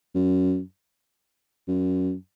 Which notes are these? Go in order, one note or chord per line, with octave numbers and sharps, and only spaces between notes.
F#2
F#2